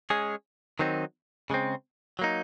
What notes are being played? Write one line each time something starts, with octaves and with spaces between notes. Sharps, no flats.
G#3 C#4 G#4
D#3 F#3 C4 D#4
C#3 G#3 C4
F#3 A#3 D#4